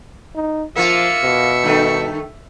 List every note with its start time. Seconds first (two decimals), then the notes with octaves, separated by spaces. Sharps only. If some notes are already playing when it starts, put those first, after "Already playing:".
0.35 D#4
0.76 F3 A#3 F4 E5 C#7
1.23 B2
1.63 G2 D#3 A3